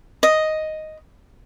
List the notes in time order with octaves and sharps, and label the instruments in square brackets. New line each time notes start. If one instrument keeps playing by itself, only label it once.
[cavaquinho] D#5